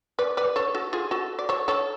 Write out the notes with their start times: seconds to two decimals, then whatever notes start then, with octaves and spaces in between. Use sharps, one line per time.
0.19 B4 D5
0.37 B4 D5
0.56 A4 C#5
0.75 F#4 A4
0.93 F4 G#4
1.11 F#4 A4
1.39 D5
1.49 A4 C#5
1.68 A4 C#5